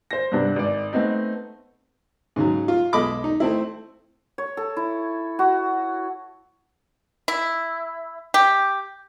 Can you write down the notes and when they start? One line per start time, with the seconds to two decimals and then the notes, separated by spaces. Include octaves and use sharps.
0.11 C5 A#6
0.32 G2 C3 B3 D4
0.56 G#1 D5
0.93 A3 B3 C4 D#4
2.36 G#2 C#3 F#3
2.68 F4
2.93 B1 G#3 A4 D#5 B5 D6
3.24 D#4
3.40 A3 C4 E4
4.38 C#5
4.57 A4
4.77 E4
5.39 F#4
7.28 E4
8.34 G4